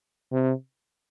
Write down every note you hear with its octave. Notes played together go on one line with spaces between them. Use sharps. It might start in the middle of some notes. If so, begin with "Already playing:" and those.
C3